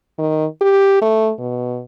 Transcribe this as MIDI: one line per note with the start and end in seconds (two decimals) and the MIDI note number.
0.19 0.46 51
0.61 0.97 67
1.02 1.31 57
1.39 1.82 47